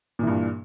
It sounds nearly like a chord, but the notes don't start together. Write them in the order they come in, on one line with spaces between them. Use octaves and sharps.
A#2 E3 G2